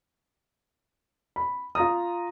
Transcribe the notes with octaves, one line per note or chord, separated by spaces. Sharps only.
B5
F4 A#5 D#6